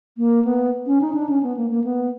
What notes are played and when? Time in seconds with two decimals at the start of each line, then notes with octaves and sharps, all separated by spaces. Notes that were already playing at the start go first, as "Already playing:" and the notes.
0.18 A#3
0.45 B3
0.86 C#4
1.01 D#4
1.14 D4
1.29 C#4
1.43 B3
1.57 A#3
1.70 A#3
1.84 B3